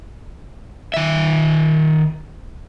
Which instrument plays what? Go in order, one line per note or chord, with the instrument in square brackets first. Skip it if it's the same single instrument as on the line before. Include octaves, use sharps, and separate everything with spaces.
[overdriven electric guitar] D#3 E5